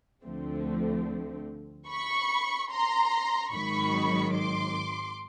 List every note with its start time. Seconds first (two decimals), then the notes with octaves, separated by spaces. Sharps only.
0.24 D2 D3 F3 A3 C4
1.88 B5 C#6
2.70 A#5 C6
3.52 G#1 G#2 D#3 F#3 B5 C#6
4.34 C6 D6